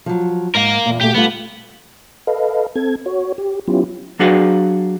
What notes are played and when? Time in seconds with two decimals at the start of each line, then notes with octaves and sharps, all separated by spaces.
0.06 F3 F#3
0.55 G#2 A#4 F5
0.86 E2 A#2
1.01 A#2 A3 F#4 G4
1.14 G3 A3 B3 F4
2.27 A4 B4 D#5 F5
2.76 C4 A4 G#6
3.06 F#4 C#5
3.38 G4
3.68 F#3 B3 C#4 E4 F4 G4
4.19 F#3 D4 F#4 G#4 B4 F5